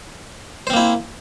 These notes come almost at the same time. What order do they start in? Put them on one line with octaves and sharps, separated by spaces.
C5 C4 A#3 E4